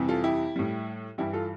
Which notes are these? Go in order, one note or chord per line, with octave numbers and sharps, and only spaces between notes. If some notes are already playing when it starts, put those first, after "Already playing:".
Already playing: F2 C3 E3 G3
F4 A4
E4 G4
A2 G3
G2 E3 G3 E4 G4
F4 A4